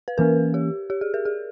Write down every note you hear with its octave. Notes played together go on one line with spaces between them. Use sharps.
B4
E3 A#3 C#4 A#4
G4
G4
G#4
A#4
G#4